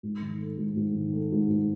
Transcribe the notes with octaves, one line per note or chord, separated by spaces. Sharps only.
G#2
D#3
A3
G#2
G#2
D#3
A3
G#2
G#2